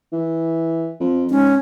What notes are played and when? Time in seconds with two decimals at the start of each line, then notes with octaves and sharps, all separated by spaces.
0.13 E3
1.00 F2
1.30 G#2 C#4